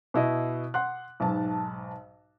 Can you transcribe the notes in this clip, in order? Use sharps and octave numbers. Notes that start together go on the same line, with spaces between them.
B2 E4 D#5
F#5 C6 F#6
B1 G#2 A5